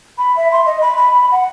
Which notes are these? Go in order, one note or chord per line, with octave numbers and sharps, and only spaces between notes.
B5
E5
C6
D#5
B5
B5
F#5